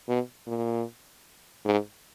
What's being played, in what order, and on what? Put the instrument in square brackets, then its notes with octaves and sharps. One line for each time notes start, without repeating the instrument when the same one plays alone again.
[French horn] B2
A#2
G#2